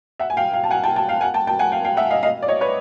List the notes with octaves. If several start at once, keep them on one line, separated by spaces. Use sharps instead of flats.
E5 F#5
G#5
F5 G5
F5 G5
A5
F#5 G#5
G5 A5
G5 A5
F5 G5
F#5 G#5
G5 A5
G5 A5
F#5 G#5
F5 G5
F5 G5
E5 F#5
D#5 F5
D#5 F5
D5
C#5 D#5
B4 C#5